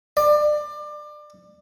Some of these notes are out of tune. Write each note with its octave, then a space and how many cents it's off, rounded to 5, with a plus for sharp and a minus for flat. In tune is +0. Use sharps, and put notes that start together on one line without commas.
D5 +25